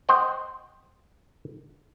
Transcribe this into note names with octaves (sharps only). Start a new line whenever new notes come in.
C5 D#5 F#5 G5